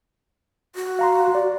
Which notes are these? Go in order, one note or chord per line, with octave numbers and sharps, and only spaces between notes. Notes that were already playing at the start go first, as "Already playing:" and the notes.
F#4
F5 A#5 C6
D5